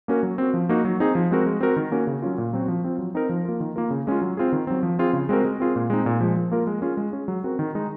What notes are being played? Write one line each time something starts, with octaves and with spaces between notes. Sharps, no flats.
A#3 C#4 F#4 A#4
F#3
C4 F#4
F3
A#3 D#4 F#4
F#3
C4 D#4 G#4
F3
G#3 C4 F#4 A#4
G#3
C4 F#4 A#4
D#3
A#3 C#4 F#4 A#4
C#3
F#3 C#4 F4
A#2
F#3 C4 F#4
F3
C4 F4
F#3
C4 D#4 A#4
F3
A#3 F4
D#3
A#3 F4 A#4
C#3
G#3 C#4 F4
F#3
C4 F4 G#4
D#3
F#3 C4
F3
C4 F4 G#4
C#3
G#3 C4 F#4 A#4
G#3
C4 F4 G#4
A#2
G#3 C4 D#4
A#2
F3 G#3
F3
A#3 F4 A#4
G#3
C#4 F4 G#4
G#3
C#4 G#4
F#3
C4 F#4 A#4
D#3
G#3 D#4